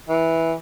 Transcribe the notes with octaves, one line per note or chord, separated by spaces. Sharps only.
E3